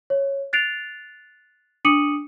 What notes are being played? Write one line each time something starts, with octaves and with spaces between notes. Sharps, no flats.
C#5
F#6 A6 C7 D7 F7
D4 D6 D#6 C#7 D#7 F#7